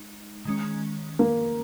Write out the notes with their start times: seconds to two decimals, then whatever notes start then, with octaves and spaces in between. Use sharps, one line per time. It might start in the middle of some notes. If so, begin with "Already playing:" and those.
Already playing: G#3 D#4
0.45 D#3 G#3 C#4
1.19 A#3